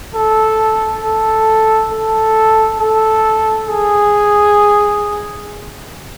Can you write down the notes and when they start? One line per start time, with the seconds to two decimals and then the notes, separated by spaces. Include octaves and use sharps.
0.15 A4
1.03 A4
1.92 A4
2.80 A4
3.68 G#4